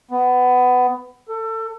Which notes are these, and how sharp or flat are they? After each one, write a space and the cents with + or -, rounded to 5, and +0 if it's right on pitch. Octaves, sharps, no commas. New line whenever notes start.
B3 +20
A4 +25